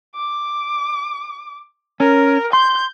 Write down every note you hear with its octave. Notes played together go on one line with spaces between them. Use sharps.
D6
C#4 A#4
C6 G6